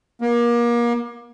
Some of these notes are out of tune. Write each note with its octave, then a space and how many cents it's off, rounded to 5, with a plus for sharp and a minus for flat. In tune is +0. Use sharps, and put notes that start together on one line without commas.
A#3 +30